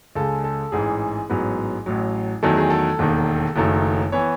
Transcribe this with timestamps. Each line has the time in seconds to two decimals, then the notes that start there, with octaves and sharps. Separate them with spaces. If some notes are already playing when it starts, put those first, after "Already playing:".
0.15 C#2 C#3 G#3 A4
0.44 A4
0.72 A1 G#2 E3 G#4
1.30 A1 G#2 F#3 B3
1.86 A1 A2 F#3
2.43 E2 D#3 F#3 A3 A4
2.57 G#4
2.70 A4
2.99 E1 D#2 D#3
3.56 F#1 F#2 D#3 A3
4.12 E3 B3 C#5